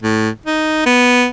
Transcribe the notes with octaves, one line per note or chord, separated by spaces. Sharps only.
A2
D#4
B3